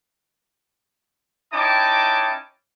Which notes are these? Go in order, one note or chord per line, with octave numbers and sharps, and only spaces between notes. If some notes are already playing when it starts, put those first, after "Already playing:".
C#4 D#4 E4 G5 A5 D6